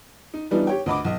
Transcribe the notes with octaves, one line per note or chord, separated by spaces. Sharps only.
D#4
E3 F3 G3 B3 D4 D#4
G4 C#5 G5
D2 D#5 B5 D6
B1 D#5